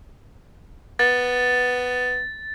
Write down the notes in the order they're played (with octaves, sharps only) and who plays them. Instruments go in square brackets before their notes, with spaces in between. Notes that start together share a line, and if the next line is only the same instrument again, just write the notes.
[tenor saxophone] B3 [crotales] A6